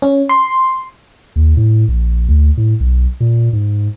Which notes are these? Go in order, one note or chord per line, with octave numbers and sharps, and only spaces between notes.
C#4
C6
D#2
A2
A#1
D2
A2
B1
A#2
G#2